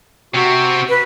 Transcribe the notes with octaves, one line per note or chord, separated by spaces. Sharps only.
C3 C4 F#4
B4